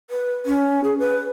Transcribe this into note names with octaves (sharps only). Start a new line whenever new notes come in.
B4
C#4
G#4
B4